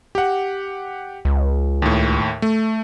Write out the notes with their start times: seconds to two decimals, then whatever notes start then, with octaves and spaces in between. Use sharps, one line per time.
0.15 G4 F#5
1.25 C#2
1.82 D#2 A2
2.42 A3